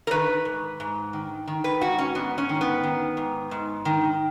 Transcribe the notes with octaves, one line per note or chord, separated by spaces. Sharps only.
A#4
D#3 B4
G#2
G#2
D#3
D#3
B4
G#2 F#4
C#4
G#2 B3
C#4
D#3
B3
D#3
G#2
G#2
D#3